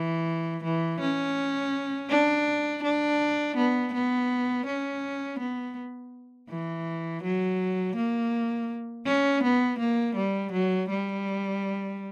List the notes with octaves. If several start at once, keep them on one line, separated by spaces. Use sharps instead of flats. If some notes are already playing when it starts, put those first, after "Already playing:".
Already playing: E3
E3
C#4
D4
D4
B3
B3
C#4
B3
E3
F#3
A#3
C#4
B3
A#3
G3
F#3
G3